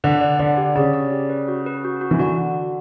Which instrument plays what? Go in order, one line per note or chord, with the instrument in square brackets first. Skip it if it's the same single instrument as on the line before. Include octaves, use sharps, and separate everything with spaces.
[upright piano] D3 [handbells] B4
[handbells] D5
[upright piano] D3 [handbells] B4
[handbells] G4
[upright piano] C#3 [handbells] D5
[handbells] D5
G4
B4
F#4
B4
F#4
F#4
[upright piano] E3
[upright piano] D3 [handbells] F#4